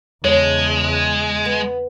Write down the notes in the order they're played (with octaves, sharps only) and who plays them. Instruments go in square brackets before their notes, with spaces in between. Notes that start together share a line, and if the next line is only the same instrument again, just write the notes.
[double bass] E2 C#3 [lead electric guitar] G#3 [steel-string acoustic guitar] C#5 A5
[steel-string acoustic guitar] B3